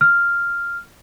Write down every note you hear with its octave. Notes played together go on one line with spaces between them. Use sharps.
F6